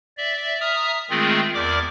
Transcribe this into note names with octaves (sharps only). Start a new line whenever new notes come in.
D5 E5
E5 A#5 D#6 F6
D#3 G#3 A3 C4 F4 G#4
E2 A#4 D5 D6